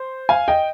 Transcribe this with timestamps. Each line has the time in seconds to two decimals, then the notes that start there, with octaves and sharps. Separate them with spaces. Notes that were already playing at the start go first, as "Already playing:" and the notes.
Already playing: C5
0.29 F5 G#5
0.48 D#5 G5